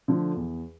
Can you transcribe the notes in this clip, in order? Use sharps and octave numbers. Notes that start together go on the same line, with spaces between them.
D3 F3 A3
E2